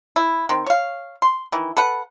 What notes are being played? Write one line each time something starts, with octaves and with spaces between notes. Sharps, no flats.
E4
D#3 C4
C#5 F5
C6
D#3 E3
A4 B4 F#5